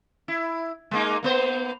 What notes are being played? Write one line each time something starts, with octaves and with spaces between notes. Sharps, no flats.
E4
G#3 A#3 D#4
A#3 B3 C5